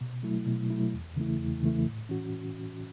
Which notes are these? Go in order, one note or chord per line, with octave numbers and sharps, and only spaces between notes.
B2
F#3 A3 E4
B2
F#3 A3 E4
E2
C#3 E3 A3 E4
E2
C#3 E3 A3 E4
A2
E3 C#4 F#4